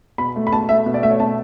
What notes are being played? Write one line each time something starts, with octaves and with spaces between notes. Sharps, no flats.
B2 B5
A3
B5
B2 A5
A3 E5
B2
D5
A3 E5
C#5
B2 A5